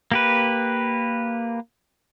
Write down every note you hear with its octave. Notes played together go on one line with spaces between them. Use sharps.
A#3 G4 B4